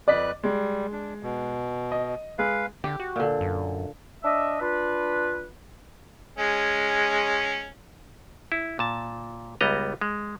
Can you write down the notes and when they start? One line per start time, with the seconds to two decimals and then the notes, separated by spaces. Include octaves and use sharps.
0.08 F2 B4 D5 D#5 F#6 B6
0.43 G3 G#3
0.92 D4
1.23 B2
1.92 D#5
2.39 G#3 G#4 B4 F5
2.84 D3 G4
3.00 F#4
3.16 A#2 D3
3.41 F#2
4.23 D4 D#5 E5
4.60 D4 F4 B4
6.38 G#3 C#4
8.52 E4
8.79 A#2 A5
9.61 C#2 G3 B3 D#5 A#5
10.01 G#3